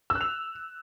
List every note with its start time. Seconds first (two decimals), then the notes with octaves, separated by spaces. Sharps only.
0.10 E6
0.15 F#6
0.21 F7